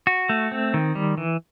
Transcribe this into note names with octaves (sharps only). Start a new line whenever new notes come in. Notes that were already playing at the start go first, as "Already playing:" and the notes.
F#4
A3
C4
D#3
G3
E3